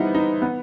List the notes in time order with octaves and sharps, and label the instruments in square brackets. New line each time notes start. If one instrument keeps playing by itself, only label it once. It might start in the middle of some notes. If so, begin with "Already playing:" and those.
Already playing: [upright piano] G3 B3 C4 D#4 E4
D#4
B3